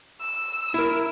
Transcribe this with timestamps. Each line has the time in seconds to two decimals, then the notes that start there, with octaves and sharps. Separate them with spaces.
0.21 E6
0.74 E4 A#4